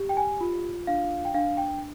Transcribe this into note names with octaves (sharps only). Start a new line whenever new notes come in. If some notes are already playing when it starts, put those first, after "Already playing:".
Already playing: G4
G5
G#5
F4
D4 F5
G5
D4 F5
G5